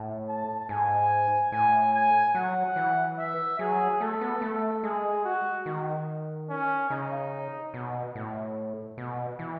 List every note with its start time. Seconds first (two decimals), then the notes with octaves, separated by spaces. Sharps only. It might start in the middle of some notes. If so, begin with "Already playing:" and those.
Already playing: A2
0.28 A5
0.69 G#2 G#5
1.52 A2 G#5
1.93 G#5
2.34 F#3 F#5
2.76 E3
3.18 E5
3.59 F#3 G#4
4.00 A3 A4
4.21 B3
4.42 A3
4.83 G#3 G#4
5.25 F#4
5.66 D#3
6.49 C#4
6.90 C#3 D#4
7.74 B2
8.15 A2
8.98 B2
9.39 E3